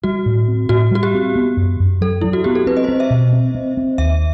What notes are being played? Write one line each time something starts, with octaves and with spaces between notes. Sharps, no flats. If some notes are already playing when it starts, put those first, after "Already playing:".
G3 F#4
A2
C4
A2 F#4
G3 F#4
G4
C4
B3
F#2
F#2
F#3 A4
F#3 E4
F#4
B3 G4
A4
C4 B4
D#5
C5
C4
E5
B2
C4
C4
C4
D#2 E5